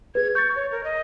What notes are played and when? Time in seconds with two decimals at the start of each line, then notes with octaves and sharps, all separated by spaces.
0.15 G#4 B4 G#6
0.35 C#6 G6 A6
0.56 C#5
0.71 A#4
0.84 D#5